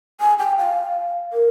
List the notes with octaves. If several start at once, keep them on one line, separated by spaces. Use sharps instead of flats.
G#5
G5
F5
A#4